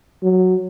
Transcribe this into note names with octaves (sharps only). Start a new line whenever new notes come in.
F#3